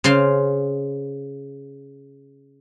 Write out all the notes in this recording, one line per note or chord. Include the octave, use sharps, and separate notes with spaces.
C#3 C5 F5 C6